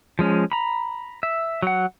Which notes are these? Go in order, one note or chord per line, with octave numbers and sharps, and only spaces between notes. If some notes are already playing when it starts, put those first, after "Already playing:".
F3 G#3 C#4
A#5 B5
E5
F#3 F#5